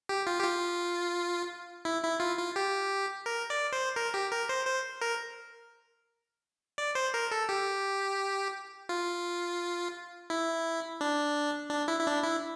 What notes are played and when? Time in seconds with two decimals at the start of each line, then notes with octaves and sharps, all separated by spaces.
0.09 G4
0.27 F4
0.39 G4
0.44 F4
1.85 E4
2.03 E4
2.20 F4
2.38 F4
2.56 G4
3.26 A#4
3.50 D5
3.72 C5
3.96 A#4
4.14 G4
4.31 A#4
4.49 C5
4.67 C5
5.01 A#4
6.78 D5
6.95 C5
7.14 A#4
7.31 A4
7.49 G4
8.89 F4
10.30 E4
11.01 D4
11.70 D4
11.88 E4
11.99 E4
12.07 D4
12.23 E4